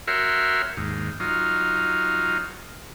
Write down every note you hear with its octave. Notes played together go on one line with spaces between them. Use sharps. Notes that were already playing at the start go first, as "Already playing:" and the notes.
F#4 A#4 C#5 E5 G5 C6
D#2 G#2
F#3 D#4 F4